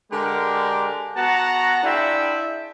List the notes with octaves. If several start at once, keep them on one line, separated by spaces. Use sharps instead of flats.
D3 G#3 D4 G4 A#4
B3 F#4 F#5 A5 A#5
D4 E4 F4 G#4 E5 G5